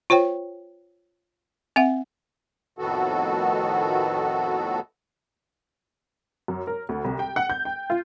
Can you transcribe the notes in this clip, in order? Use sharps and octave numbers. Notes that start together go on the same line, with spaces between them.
F4 C5 C#5 G5
C4 E5 F#5
F2 A2 D#3 B3 F#4 A4
F#2
A#4
D2
C2
G5
F#5
G6
G5
F4